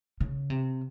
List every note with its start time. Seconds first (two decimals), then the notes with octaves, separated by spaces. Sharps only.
0.21 C#3
0.50 C3